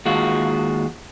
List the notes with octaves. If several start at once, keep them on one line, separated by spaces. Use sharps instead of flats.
D#2 G#3 F4 F#4